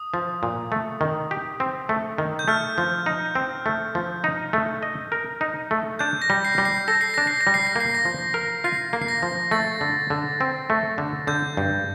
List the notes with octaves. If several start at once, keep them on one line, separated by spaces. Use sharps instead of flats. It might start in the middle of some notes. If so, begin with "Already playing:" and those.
Already playing: D#6
F3
A#2
A3
D#3
G4
C4
A3
D#3
G6
A3 F6
F3
D#4
C4
A3
F3
D#4
A3
D#5
A#4
D#4
A3
D4 G6
A#6
G3
C7
G3
C7
A4 A#6
C7
D4 A#6
C7
A#6
G3
C7
A#6
A#3 C7
A#6
F3
A#4
F4 C7
A#3
C7
A#6
F3
A3 A6
D3
D3
C4
A3
D3
D3 G6
G2